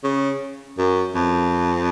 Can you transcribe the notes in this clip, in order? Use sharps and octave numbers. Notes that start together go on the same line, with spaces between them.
C#3
F#2
F2